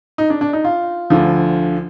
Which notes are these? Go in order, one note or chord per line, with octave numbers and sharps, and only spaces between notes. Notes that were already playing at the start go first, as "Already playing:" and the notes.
D#4
D4
D4
D#4
F4
D2 D3 F3